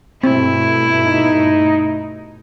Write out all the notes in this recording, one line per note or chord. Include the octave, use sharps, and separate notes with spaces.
G2 B2 A3 C4 E4
D#4